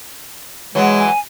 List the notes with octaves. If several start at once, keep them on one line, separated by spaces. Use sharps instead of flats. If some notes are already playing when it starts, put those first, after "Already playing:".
E3 F#3 G#3
G#5